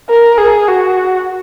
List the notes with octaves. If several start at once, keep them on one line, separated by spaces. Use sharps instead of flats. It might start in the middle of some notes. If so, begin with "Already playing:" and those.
A#4
G#4
F#4